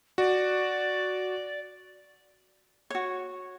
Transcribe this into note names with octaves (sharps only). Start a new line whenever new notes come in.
F#4 D5
F#4 C#5